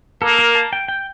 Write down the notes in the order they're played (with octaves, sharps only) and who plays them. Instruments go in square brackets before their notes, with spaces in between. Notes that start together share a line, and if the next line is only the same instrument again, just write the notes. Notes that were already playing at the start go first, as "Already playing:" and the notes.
[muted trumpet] A#3 [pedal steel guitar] A4
[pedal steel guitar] A#4
A5
G5
G5